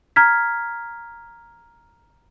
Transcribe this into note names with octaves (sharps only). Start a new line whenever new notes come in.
A#5 F6 G#6 B6